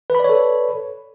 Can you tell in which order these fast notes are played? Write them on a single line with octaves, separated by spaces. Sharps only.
B4 B5 D5 C#5 A4